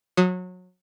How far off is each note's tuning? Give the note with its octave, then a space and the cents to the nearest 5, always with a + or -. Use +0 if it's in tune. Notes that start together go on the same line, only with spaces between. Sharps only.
F#3 -25 D#6 +0